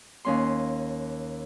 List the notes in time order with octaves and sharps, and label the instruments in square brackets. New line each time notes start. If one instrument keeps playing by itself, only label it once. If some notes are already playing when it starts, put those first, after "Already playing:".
[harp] D#2 C#4 C6